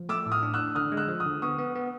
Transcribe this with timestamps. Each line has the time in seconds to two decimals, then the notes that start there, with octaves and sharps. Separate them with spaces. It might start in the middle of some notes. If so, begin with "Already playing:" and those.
Already playing: F3
0.09 A3 D6 E6
0.26 A2
0.32 D#6 F6
0.43 D4
0.54 E6 F#6
0.59 D4
0.75 D3 D#6 F6
0.92 G#3
0.97 E6 F#6
1.08 F3
1.20 D#6 F6
1.26 D3
1.42 B3 C#6 D#6
1.59 B3
1.75 B3